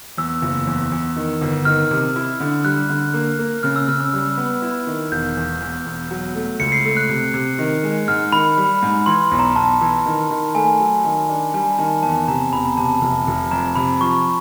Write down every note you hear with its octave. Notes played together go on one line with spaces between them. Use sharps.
E2 E6
F#1
E2
E2
D#3
G1
D#3 F6
C3
E4
D3
G3 F#6
D3
A#3
A#3
C#3 F6
E6
C#3 F6
E6
G3
B3
E4
D#3
E1 G6
E2
E2
E1
F#3
A3
C#2 C#7
C7
A3
F#6
C3
C3
D#3
G#3
G#2 F6
D#3 B5
G3
G#2
E3 C6
B1
A#5
B1 A5
E3
D#3
D#3
A3 G#5
F#3
D#3
D4
G3 G#5
D#3 A5
E2 A5
C3 A#5
E1 B5
A#5
C3 A5
A5
F1
F1
F2 A#5
C3 B5
F3 C#6